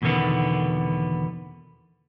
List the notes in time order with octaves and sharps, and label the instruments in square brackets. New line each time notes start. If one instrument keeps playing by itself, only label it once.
[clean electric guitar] E2 B2 D3 D#3 B3